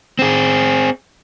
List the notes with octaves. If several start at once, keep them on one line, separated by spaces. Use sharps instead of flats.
C4 G#4